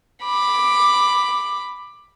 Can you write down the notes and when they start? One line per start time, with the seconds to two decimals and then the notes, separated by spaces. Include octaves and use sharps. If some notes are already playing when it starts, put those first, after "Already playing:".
0.24 B5 D6